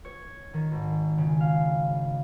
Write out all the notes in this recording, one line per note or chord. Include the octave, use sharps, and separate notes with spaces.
C#5
D#3
G#1
C#3
F5